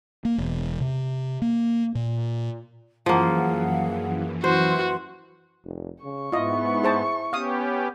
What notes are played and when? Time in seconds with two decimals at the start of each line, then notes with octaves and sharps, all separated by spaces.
0.25 A#3
0.38 E1
0.80 C3
1.42 A#3
1.95 A#2
3.06 F#2 E3 F3 A#3 G#4 F5 F#5
4.44 E4 F#4 B4 C5 C6
5.64 F1
6.04 C#3 C#6
6.32 G#2 B3 E4 F4 D#5
6.83 G#4 C5 A5
7.33 B3 C#4 G4 F5 D#6